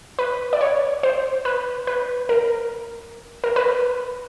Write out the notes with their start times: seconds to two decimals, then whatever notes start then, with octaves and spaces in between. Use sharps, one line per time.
0.19 B4
0.53 D5
0.61 C#5
1.03 C5
1.45 B4
1.87 B4
2.29 A#4
3.44 A#4
3.56 B4